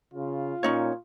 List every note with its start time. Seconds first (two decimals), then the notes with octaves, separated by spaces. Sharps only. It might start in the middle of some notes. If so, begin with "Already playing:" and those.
0.14 C#3 F4
0.63 A#2 C#4 D#4 C#5